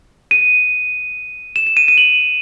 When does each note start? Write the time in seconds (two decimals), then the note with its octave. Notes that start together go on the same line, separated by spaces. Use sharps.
0.31 D#7
1.56 E7
1.67 E7
1.77 D#7
1.88 D#7
1.98 F#7